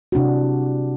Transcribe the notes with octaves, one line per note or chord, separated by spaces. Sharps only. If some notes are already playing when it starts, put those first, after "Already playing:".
C3 D4 E4 F#4